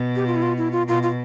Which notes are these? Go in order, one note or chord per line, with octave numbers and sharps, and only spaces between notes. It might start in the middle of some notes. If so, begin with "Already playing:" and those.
Already playing: B2
G4
F4
E4
F4
E4
F4
B2 F4
F4